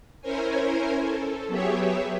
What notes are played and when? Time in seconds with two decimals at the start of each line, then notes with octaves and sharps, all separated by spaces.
0.21 C#4 E4 A#4 C5 C#5 G#5
1.01 A4
1.47 F#3 B3 G4 G#4 C#5 E5